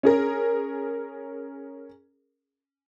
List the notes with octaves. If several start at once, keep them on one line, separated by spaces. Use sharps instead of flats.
C#4 G#4 A#4